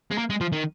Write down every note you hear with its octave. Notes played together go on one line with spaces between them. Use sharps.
G#3
A#3
G#3
F3
D#3